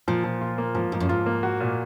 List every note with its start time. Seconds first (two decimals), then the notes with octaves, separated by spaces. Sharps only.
0.08 A#2 F3
0.24 F3
0.41 F4
0.58 A#3
0.75 G#2 F3
0.92 G#2 F3
1.00 F#2
1.09 G#2 F4
1.26 A#3
1.43 F#4
1.60 A#2